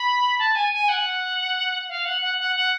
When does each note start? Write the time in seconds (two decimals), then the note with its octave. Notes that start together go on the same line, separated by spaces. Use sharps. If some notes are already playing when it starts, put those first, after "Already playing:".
Already playing: B5
0.39 A5
0.55 G#5
0.72 G#5
0.88 F#5
1.88 F5
2.05 F#5
2.21 F#5
2.38 F#5
2.55 F#5